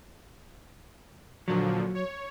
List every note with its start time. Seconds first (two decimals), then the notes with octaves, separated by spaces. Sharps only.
1.48 A#2 D3 F3 F#3
1.95 C#5